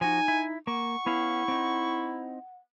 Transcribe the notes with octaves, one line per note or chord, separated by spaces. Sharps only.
F3 D#4 F#4 G#5
E4
A#3 F#5 C#6
B3 C#4 E4 F5
C4 D#4